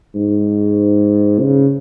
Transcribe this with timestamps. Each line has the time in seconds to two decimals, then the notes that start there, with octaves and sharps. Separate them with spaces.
0.15 G#2
1.40 C#3